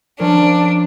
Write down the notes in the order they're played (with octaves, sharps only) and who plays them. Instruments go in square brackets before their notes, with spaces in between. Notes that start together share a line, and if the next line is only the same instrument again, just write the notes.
[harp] F3 C#4 A#4 [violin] D4